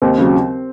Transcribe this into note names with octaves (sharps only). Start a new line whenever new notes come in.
D#2 C4
C#3 F#3